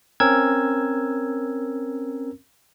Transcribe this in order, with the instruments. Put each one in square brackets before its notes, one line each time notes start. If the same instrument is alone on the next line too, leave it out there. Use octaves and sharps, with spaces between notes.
[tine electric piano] C4 C#4 A#4 E6 G#6